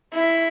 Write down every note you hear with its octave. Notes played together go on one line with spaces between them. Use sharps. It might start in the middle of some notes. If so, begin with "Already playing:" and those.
E4